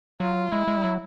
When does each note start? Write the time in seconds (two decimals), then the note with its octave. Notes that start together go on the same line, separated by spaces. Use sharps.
0.20 F#3 F4
0.52 G#3 E4
0.68 G#3
0.77 G3
0.84 F#3